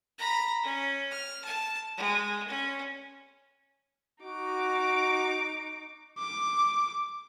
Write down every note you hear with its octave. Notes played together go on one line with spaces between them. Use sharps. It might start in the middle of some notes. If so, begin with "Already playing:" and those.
A#5 B5
C#4
F6
A5
G#3
C#4
D#4 F#4 D6
D6